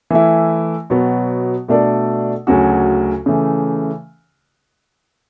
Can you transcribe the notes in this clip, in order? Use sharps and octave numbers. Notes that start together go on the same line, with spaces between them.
E3 A3 E4
B2 F#3 B3
B2 A3 D4 A4 D5
D2 C#3 F#3 C#4 F#4
C#3 E3 A3